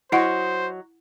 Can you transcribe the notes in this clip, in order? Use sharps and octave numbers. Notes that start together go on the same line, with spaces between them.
F#3 E4 F#4 C5 D#5 F#5